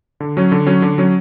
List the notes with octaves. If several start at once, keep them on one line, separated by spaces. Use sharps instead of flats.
D3
F#3 C#4
D3
F#3 C#4
D3
F#3 C#4